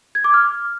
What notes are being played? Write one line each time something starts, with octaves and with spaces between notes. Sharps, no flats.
G#6
D6
F6